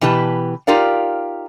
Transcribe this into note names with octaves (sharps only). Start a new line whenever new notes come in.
B2 E3 G4 B4 A5
D#4 F4 G4 A#4 D5 F5